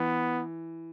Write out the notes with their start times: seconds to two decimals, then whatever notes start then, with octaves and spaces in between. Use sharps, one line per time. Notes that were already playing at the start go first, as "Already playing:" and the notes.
Already playing: E3 B3